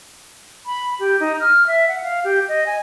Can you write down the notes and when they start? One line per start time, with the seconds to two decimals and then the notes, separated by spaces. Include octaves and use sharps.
0.66 B5
1.00 G4
1.20 D#4
1.41 F6
1.67 E5
1.88 F#5
2.03 F5
2.24 G4
2.48 D#5
2.66 G#5